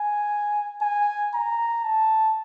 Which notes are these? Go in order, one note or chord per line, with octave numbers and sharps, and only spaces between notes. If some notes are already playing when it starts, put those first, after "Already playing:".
Already playing: G#5
G#5
A#5
A5